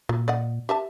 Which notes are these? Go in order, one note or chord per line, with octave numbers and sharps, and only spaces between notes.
A#2 F#3
D5 D#5 F#5
G4 E5 A5